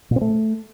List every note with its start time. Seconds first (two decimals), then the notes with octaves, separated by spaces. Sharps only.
0.11 A#2
0.16 C4
0.21 A3